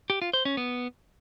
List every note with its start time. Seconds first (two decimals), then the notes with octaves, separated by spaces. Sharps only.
0.10 G4
0.22 F4
0.33 C5
0.45 C#4
0.57 B3